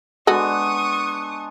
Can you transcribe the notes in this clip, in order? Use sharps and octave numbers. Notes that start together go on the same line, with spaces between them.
G#3 B3 D4 F#4 G#4 A4 C#6 D#6